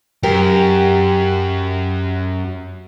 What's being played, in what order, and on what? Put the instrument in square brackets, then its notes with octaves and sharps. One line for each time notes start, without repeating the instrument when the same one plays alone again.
[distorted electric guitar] F#2 [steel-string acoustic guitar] G4 A#4